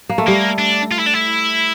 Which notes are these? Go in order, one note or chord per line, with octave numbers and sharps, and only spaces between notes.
A#3
A3
G3 A#3
D4
F4
E4
D4
E4